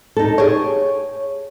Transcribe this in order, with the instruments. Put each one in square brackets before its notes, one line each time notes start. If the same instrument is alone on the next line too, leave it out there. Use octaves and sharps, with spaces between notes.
[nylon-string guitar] D#4 A4
[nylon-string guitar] G4 G#4 [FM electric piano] C#5